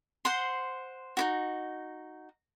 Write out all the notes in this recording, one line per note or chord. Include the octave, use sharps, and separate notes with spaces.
C5 F#5 C6
D#4 E4 F#4